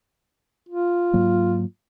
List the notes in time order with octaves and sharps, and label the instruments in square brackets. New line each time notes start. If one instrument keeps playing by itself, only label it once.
[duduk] F4
[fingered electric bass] G#2 F#3 A#3